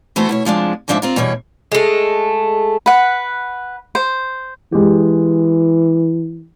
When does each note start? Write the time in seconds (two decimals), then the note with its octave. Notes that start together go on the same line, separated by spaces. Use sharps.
0.16 E3 A3 B3 F#4 A4 C5
0.29 B2 E4 C#5
0.45 C3 F3 G#3 D4
0.88 D#2 G#2 F3 D4 D5 E5
1.02 C4 F4 A#4
1.16 E2 B2 G3 C#5
1.72 G#3 A3
2.86 B4 F#5
3.95 C5
4.72 E3 G#3 G4